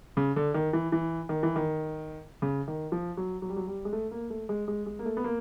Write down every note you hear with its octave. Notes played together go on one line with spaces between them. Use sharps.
C#3
D3
D#3
E3
E3
D#3
E3
D#3
C#3
D#3
F3
F#3
F#3
G3
F#3
G3
G#3
A3
A#3
A3
G#3
G#3
G#3
A#3
A3
B3
A#3